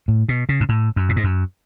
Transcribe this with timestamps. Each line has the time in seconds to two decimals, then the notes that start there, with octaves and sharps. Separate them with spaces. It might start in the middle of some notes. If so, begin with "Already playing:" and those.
0.08 A2
0.29 B2
0.49 C#3
0.61 G#2
0.69 A2
0.96 F#2
1.09 A2
1.16 G#2
1.24 F#2